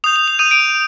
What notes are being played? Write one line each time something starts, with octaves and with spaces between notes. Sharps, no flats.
D#6 G6 F7
F7
F7
D#6 G6 D#7
D7